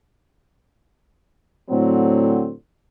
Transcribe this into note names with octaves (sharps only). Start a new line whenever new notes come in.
A2 D3 F#3 C4